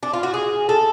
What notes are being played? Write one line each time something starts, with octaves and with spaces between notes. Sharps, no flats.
D4
F4
F#4
G#4
A4